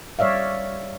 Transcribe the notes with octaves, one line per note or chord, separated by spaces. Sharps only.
G3 C#5 D5 E5 F5